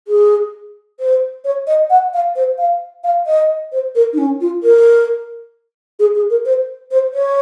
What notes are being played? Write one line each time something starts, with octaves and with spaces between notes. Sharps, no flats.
G#4
C5
C#5
D#5
F#5
F5
C5
F5
F5
D#5
C5
A#4
D#4
C#4
F4
A#4
G#4
G#4
A#4
C5
C5
C#5